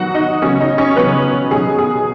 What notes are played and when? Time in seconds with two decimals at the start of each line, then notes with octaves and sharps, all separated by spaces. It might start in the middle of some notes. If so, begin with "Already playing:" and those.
Already playing: D#3 F#3 B3 D#4 F#4 F#5
0.14 D#4 D#5
0.42 C#3 F#3 B3 C#4 C#5
0.60 D#4 D#5
0.78 C#4 C#5
0.96 C#3 F#3 B3 B4
1.51 B2 F#3 B3 D#4 G#4
1.79 G#4